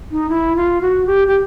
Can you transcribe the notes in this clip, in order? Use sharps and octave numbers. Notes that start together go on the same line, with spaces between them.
D#4
E4
F4
F#4
G4
G4